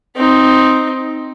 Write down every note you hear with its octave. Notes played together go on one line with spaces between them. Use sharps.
C4 D#4